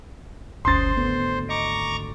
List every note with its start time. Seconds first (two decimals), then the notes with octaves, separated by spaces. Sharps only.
0.65 D1 G1 D2 C#4 C5 C6 D#6 A6
0.97 G#1 D2 D3 B3
1.49 D#5 A#5 C#6 D6